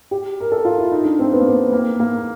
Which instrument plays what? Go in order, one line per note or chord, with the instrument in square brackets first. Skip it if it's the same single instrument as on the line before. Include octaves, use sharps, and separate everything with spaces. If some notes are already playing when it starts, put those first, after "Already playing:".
[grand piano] G4
A#4
A4
F4
E4
D#4
D4
C4
B3
A#3
B3
A#3
A#3